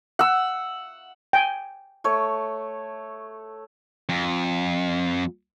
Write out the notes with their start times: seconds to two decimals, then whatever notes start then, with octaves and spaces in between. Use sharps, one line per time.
0.19 F#5 E6
1.33 G5 G#5
2.04 A3 C#5
4.09 F2